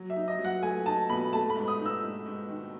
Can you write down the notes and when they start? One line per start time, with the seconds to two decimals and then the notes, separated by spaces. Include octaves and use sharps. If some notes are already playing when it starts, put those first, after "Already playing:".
Already playing: F#3
0.10 E5
0.16 D#4
0.28 D#5
0.39 F#3
0.45 F#5
0.62 A3 G#5
0.86 D#4 A5
1.09 B2 B5
1.33 A3 A5
1.50 B5
1.56 G#2
1.68 D#6
1.79 D#4
1.86 E6
2.03 G#2
2.26 G#2
2.50 D#3